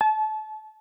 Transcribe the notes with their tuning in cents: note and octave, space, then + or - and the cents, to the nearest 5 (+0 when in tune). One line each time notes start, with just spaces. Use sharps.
A5 -30